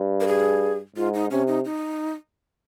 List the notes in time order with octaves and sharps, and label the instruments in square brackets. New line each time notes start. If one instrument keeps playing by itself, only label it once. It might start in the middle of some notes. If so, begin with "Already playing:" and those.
Already playing: [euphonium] G2
[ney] A#4
G#4
[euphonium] G#2 [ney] F4
[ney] D#4
[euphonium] C3 [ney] C#4
[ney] D#4
D#4